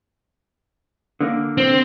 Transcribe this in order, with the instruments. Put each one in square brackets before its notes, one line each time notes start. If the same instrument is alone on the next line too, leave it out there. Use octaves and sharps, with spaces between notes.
[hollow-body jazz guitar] D3 A#3
[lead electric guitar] C4